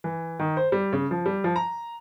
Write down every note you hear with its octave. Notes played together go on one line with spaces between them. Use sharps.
E3
D#3
C5
G3
C#3
F3
G3
F3
A#5